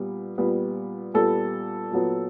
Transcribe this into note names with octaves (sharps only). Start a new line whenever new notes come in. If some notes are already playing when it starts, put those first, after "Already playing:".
Already playing: A#2 G3 B3
A#2 G3 B3
A#2 G3 B3 A4
A#2 F#3 B3